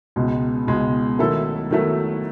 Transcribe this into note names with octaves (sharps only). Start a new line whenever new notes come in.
C#2 B2 G#3
C#2 B2 G#3
D#3 F#3 A3 E4 A4
D#3 F#3 A3 E4 A4